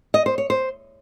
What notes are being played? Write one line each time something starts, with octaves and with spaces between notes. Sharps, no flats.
D#5
C5
C#5
C5